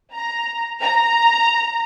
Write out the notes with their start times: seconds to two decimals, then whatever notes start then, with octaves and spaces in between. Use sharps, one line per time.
0.16 A#5
0.82 A#5